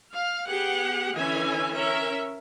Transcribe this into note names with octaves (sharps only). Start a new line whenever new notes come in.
F5
B3 G4 G#4 F#5
D3 E3 C#4 E5 G#5
C#4 A#4 E5